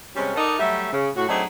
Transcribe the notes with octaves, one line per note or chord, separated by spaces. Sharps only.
C3 G3 G#3 C#4
D#4 A4 A#4 D5 D#5 F#5
F#3 G3 A3 E5
C#3
A2 F#4
F#3 A3 C4 D4 D#4 G#4